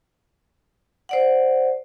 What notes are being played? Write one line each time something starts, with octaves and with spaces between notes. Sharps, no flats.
C5 D5 F#5